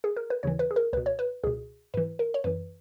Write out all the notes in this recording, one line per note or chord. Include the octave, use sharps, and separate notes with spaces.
G#4
A#4
B4
D#2 C#3 E3 C#5
B4
G#4
A#4
C#2 B2 B4
C#5
B4
C#2 B2 G#4
G#2 E3 B4
A#4
C#5
F#2 E3 B4